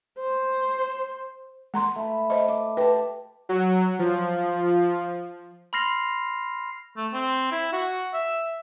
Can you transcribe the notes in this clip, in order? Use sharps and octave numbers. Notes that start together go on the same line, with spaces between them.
C5
G#3 A#5 C6
A3 B5
C5 D#5
D6
G4 B4 A5
F#3
F3
B5 C6 F6 A#6 C7 F7
A3
C4
E4
F#4
E5